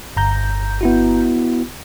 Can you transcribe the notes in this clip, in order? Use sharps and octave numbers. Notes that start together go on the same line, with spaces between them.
G1 A#5 G6
B3 E4 F#4